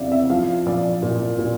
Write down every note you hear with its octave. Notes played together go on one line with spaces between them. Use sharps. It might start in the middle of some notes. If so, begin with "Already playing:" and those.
Already playing: E2 C3 D5 E5 F5
E5
F3 F5
A#1 D5
A#2
A#2